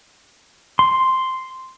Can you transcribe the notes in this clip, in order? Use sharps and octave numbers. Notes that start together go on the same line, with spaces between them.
C6